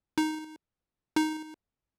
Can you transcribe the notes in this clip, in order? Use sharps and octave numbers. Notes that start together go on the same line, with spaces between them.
D#4
D#4